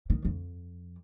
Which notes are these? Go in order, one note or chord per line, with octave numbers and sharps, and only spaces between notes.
D#3
F2